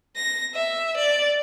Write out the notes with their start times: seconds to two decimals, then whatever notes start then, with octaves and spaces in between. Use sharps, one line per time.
0.16 A#6
0.55 E5
0.97 D5